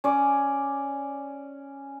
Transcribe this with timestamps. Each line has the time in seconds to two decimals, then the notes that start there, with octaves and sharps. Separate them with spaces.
0.04 C#4 D5